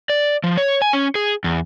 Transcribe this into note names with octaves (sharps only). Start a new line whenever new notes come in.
D5
F3
C#5
G#5
C#4
G#4
E2